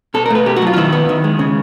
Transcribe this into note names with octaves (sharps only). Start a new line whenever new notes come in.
B2 A4
A#4
A3 B4
B2 G4
F#4
F#3 F4
F4
D#3 E4
B3
D#3
G#3
C#3